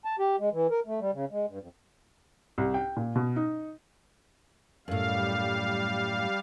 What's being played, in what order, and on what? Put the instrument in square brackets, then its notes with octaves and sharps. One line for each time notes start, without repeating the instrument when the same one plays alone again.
[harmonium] A5
G4
G#3
E3
A#4
A3
G3
C#3
G#3
G2
F2
[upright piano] C2
G5
A#2
B2
D#4
[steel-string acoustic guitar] F#2 A2 [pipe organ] G3 F5